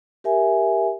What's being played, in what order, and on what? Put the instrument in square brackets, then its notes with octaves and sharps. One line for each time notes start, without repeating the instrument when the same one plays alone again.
[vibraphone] G4 A#4 E5 G#5